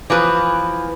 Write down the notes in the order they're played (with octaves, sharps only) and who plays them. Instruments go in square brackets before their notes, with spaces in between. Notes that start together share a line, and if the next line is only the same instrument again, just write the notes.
[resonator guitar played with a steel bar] E3 F3 B4